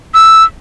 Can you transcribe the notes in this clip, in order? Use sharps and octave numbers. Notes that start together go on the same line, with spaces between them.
E6